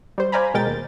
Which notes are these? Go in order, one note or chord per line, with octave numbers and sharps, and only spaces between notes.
G3 C5
C5 D5 F5 G#5 A#5 B5
B2 G#3 A#4 G5 A6
D#2